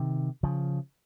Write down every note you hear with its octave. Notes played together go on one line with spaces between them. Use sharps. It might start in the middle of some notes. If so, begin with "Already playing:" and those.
Already playing: C3 D#3
C#3 F3